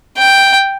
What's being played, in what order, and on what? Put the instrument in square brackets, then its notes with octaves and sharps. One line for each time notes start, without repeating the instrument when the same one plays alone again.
[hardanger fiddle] G5